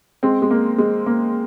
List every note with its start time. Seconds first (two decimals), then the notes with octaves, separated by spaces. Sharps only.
0.23 G#3 C4
0.42 G#3
0.51 A#3
0.78 G#3
1.06 A#3